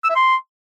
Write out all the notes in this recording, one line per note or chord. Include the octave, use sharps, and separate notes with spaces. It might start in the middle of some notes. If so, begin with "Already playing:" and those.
E6
E5
C6